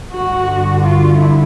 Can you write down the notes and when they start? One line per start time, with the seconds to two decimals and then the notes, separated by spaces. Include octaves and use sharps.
0.14 G2 D3 F#4
0.82 F4
1.15 E4